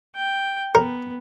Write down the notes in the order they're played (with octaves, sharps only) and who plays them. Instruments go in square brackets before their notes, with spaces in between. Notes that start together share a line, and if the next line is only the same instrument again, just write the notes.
[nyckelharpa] G5
[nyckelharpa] B3 [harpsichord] A#4